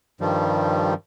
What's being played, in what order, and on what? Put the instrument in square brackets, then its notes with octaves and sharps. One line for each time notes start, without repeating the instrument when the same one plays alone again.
[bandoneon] G2 D#3 F3 G3